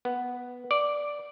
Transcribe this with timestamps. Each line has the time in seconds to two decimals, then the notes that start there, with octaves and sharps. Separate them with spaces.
0.05 B3
0.71 D5